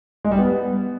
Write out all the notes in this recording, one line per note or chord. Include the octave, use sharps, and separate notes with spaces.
G#3
G3
B3